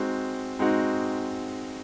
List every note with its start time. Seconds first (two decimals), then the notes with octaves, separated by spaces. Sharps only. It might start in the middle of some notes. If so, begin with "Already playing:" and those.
Already playing: G#3 C4 D#4 F#4
0.59 G#3 C4 D#4 F#4